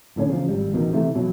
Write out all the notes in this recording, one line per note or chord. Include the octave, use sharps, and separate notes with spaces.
F1 A2 D3 C#4
E2 C#3 F3
G#1 G3
A1 E2 B2 D#3
C3 E3 A3
E2 B2 F#3